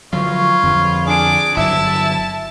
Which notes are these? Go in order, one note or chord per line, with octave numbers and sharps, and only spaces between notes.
D3 F3 F#3 F4 B4 C#5 C#6
F2 D3 F3
D4 G#4 D6
G1 G2 F#3 E4 E5 A5